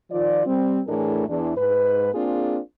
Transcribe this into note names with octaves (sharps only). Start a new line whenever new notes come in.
D#3 F3 F4 D5
G3 C4
A2 E3 A3 D4 G#4 A#4
E2 D4
G#2 B4
A#3 C4 D4 F4 G#4